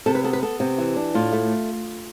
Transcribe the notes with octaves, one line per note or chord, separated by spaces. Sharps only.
C3 A4
B4
B3 A4
B4
B3 A4
C3 G4
E3
D4
A2 F4
A3